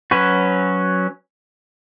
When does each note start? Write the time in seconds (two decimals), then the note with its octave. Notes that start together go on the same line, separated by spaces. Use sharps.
0.11 F#3 C#4 F#4 B4